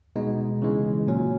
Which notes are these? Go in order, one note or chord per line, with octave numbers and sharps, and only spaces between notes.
B2 G#3 B3 D#4
C#3 E3 G#3
A#2 F#3 C#4